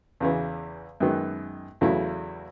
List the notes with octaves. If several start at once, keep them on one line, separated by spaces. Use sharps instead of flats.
E2 C#3 E3
F#2 D#3 G#3 B3
E2 C#3 F#3 A3 E4